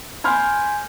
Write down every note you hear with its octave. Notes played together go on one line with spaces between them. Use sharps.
G#5 B5 C6 F6 G6 G#6